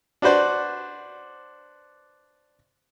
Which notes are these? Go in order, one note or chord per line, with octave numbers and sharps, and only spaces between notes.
D4 F#4 B4 C5 D5